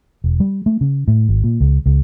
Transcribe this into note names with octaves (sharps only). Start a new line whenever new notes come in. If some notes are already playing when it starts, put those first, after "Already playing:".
E1
G3
A3
C#3
A2
G#1
A#2
C#2
C#2